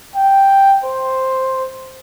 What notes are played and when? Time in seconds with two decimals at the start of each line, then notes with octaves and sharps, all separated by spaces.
0.16 G5
0.84 C5